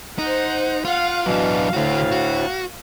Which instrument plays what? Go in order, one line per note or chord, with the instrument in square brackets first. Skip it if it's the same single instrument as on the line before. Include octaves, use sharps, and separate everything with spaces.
[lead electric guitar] D#4 [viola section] C5 F#5
[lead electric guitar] F4 [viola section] F5 F#5
[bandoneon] B2 E3 [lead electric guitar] F#3 D4 [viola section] F5
[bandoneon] D2 A2 [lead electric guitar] D3 F#4
[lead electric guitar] F#4